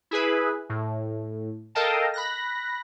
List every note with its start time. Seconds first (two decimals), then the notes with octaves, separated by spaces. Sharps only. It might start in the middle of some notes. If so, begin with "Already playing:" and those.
0.11 E4 G#4 B4
0.69 A2
1.75 A4 A#4 D#5 F5 G5 A5
2.14 B5 F#6 A#6